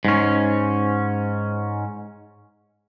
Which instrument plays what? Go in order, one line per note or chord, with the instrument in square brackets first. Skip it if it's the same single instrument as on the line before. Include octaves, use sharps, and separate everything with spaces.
[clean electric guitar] G#2 C#4